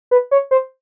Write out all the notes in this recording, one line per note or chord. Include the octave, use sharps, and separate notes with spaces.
B4
C#5
C5